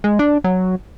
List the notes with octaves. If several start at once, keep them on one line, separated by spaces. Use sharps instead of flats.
G#3
D4
F#3